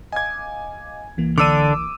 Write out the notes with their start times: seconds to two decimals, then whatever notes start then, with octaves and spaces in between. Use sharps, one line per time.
0.12 D#5 F5 G#5 D6 G#6
1.17 C2 E3 A#3
1.38 D3 D4 D6 E6 D#7